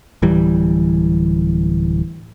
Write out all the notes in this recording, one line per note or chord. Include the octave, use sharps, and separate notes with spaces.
D1 E3 G3